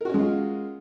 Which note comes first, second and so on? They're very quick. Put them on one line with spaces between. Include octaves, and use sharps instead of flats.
A#4 F#4 C#4 G#3 F4